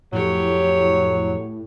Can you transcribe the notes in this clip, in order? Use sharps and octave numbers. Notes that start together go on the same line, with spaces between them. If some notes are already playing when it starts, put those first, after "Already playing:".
F2 A2 F#3 G4 C#5